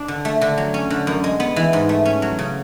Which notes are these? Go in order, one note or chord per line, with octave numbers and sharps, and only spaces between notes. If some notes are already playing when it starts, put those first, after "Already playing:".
Already playing: D4
D3
A3
D3
F#3
C#4
D3
F#2
G#3
B3
E3
G#2
A3
C#4
F#3
C#3